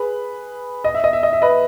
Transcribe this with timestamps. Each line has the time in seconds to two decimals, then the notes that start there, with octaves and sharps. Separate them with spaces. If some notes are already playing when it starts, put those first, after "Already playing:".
Already playing: G#4 B4
0.84 D#5
0.95 E5
1.04 D#5
1.13 E5
1.23 D#5
1.33 E5
1.42 B4 D#5